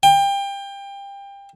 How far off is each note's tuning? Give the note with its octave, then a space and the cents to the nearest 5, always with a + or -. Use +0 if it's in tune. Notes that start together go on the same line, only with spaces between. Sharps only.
G5 +25